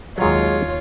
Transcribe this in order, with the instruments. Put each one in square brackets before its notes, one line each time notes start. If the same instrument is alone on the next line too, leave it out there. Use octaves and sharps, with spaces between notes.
[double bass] D#2 [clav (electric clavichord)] F#3 G#3 [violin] F4 [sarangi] C#5